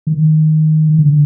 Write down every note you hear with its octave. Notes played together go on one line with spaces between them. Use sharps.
D#3
D3